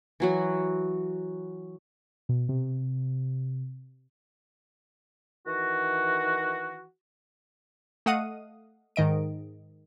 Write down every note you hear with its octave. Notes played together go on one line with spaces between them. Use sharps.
E3 F#3 F#4
B2
C3
D#3 E3 F#4
A3 D#5 F5 F#5 D#6 D#7
G#2 D#3 D#5 D7